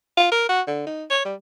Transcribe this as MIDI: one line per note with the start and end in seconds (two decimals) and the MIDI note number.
0.17 0.27 65
0.32 0.47 70
0.49 0.61 66
0.67 0.85 50
0.87 1.04 63
1.11 1.22 73
1.25 1.35 55